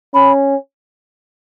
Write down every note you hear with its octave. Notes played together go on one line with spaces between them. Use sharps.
C#4 B5